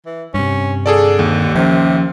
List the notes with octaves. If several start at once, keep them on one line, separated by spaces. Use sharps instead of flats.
E3
G2 C3 C#4
D3 G#4 A4 D5
D#2
C3 F3 C#4